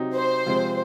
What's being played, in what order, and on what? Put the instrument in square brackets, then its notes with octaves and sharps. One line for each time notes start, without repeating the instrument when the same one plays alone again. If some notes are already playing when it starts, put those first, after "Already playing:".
Already playing: [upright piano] C3 F#3 C4 D#4
[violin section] C5
[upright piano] C3 F3 G#3 C4